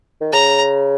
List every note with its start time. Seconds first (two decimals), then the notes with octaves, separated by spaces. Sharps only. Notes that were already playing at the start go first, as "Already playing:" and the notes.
0.21 D#3
0.33 C#3 A#5